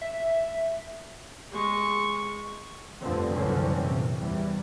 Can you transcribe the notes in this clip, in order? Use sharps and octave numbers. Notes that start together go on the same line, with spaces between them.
E5
G#3 C#6
F1 G2 D3 F3 C4
F#1 C2 D3 E3 C4 C#4
A#1 C3
E2 E3 G3